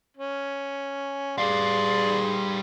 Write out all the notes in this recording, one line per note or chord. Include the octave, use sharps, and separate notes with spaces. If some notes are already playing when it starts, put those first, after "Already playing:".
C#4
G3 G#4 D5 F5 C6